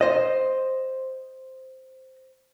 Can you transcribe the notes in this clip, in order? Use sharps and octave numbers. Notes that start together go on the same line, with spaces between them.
C5 D#5